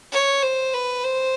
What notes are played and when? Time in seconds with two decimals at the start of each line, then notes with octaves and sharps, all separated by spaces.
0.12 C#5
0.43 C5
0.74 B4
1.04 C5